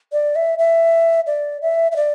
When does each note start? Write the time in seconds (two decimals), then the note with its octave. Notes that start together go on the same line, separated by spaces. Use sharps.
0.13 D5
0.36 E5
0.59 E5
1.27 D5
1.62 E5
1.92 E5
1.96 D5